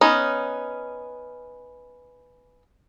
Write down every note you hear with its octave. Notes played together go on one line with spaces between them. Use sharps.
B3 C#4 D#4